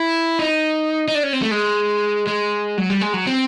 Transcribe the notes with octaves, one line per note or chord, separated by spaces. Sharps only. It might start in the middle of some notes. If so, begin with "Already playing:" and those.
Already playing: E4
D#4
D#4
D4
C#4
C4
A3
G#3
G#3
F#3
G3
G#3
F#3
C4